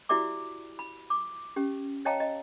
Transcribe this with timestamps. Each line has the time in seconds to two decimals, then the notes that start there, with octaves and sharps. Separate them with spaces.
0.09 E4 F#4 G4 D5 E5 D6
0.79 B5
1.10 D6
1.56 C#4 G4
2.05 C#5 D#5 F5 G5 A5 A#5
2.20 D#5